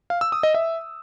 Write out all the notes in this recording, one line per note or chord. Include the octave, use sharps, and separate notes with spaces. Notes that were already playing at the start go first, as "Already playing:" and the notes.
F5
E6
D#6
D#5
E5